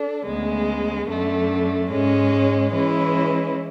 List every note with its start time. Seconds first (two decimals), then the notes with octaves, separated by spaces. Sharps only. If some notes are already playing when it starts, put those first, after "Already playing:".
Already playing: D4 A4
0.25 D2 C#3 G#3 B3
1.08 F#2 D3 A3
1.90 G#2 G#3 C#4
2.72 E3 G#3 C#4 E4